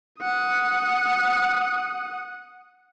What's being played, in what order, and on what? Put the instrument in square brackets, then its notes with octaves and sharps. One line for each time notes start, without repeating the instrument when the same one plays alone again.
[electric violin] F#5 D#6